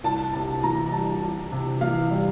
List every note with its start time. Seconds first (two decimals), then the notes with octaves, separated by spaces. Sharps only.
0.04 C2 A5
0.33 C3 A5
0.63 E3 A#5
0.92 G3 A5
1.22 C2
1.52 C3
1.81 E3 F5
2.11 G3